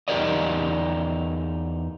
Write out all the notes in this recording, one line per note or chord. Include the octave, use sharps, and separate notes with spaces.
E2 D#4 G4 A#4 D5 D#5